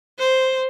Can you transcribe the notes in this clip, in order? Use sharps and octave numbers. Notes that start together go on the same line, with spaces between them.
C5